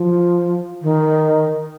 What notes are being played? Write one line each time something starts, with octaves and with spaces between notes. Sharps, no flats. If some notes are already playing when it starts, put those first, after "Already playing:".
Already playing: F3
D#3